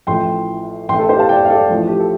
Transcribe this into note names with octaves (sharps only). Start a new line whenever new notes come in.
A1 A2 F3 G5 C6
A1 A2 A3 G5 C6
A4
G4 C5
F5 A5
D5 G5
F5
A4 D5
A1 A2 F3 A3
G4
A4